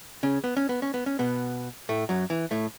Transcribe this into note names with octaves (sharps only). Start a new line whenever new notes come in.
C#3 C#4
B3
C#4
B3
C#4
B3
C#4
B2 B3
A2 A3
F#2 F#3
E3
A2 A3